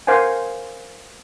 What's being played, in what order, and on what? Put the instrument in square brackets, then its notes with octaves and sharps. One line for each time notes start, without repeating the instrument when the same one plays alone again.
[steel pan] A#4 C5 F5 F#5 G#5